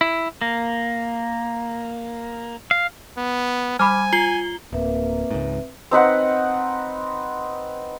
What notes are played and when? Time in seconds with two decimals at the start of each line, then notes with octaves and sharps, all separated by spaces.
0.01 E4
0.41 A#3
2.71 F5
3.17 B3
3.79 G3 G#5 B5 D6 F6
4.13 F4 C7 G7
4.72 D1 A#3 C4 B4 E5
5.31 C#2 G#2
5.91 C4 D#4 B4 F#5